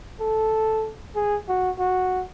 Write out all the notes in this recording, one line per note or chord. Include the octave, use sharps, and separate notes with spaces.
A4
G#4
F#4
F#4